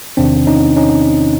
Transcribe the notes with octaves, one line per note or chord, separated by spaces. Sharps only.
E2 C3 D#3 C4 D4
C#4 D#4
C#4 D#4